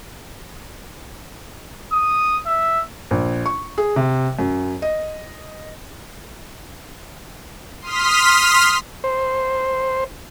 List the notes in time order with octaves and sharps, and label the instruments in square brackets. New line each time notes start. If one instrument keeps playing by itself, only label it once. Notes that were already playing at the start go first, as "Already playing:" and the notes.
[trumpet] D#6
E5
[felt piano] A#1
C#6
G#4
C3
F#2
D#5
[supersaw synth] C6 D#6 F6 B6
[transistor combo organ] C5